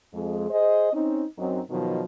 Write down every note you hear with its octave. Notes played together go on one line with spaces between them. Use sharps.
F2 G#3
G#4 C5 D#5
C4 C#4 D#4
F#2 F#3 C4 D#4
B2 D#3 F3 F#3